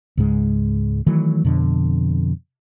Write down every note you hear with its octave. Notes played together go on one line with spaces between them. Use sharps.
C#2 G#2 G#3
D#3 E3 F#3 A3
F2 B2 D3